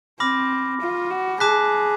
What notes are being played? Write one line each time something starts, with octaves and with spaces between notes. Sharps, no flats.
C4 B5 D6 F6 A#6
F4
F#4
G#4 A5 D6 F#6 B6